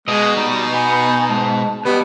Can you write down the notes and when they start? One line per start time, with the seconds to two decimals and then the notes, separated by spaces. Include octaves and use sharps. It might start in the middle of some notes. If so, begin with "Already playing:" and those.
0.08 B2 G#3 D#5
0.37 G3 D#4
0.73 B3 G#5
1.30 G#2 A5
1.85 B2 G3 B3 G4